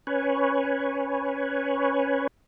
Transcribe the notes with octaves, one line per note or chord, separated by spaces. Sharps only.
C#4 B4 C#5